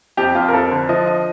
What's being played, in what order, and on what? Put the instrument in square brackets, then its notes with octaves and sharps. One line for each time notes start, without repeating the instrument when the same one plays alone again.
[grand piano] F2 G4
F2 F4
A#4
F2 A4
D3
F3 D#5
D#5